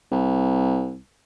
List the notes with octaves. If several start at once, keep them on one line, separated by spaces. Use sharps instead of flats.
C2